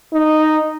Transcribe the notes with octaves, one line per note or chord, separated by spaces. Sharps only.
D#4